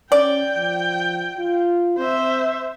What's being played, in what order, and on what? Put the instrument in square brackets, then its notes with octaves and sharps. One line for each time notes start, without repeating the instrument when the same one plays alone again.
[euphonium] C#4 [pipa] D5 [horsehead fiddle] G5
[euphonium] F3
F4
[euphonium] C4 [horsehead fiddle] C5 E5